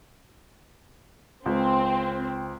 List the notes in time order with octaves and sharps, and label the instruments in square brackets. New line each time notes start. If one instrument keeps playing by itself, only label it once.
[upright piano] C#2 [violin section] C4